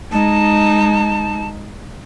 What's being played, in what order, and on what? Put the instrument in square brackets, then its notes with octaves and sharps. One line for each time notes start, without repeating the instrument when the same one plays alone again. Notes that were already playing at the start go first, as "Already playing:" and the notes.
[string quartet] G#3 D#4 [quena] A5